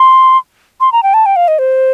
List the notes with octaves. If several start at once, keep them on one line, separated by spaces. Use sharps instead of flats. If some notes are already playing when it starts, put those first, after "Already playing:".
Already playing: C6
C6
A#5
G5
A5
G5
F5
D#5
C5